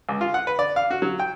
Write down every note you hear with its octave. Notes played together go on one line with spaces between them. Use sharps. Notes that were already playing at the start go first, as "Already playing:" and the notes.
C#2
F4
F#5
B4
D5
F5
F#4
F#3
G5